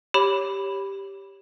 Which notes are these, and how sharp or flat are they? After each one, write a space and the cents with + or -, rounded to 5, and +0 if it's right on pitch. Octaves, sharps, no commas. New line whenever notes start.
G4 +0 C#5 +0 B5 +0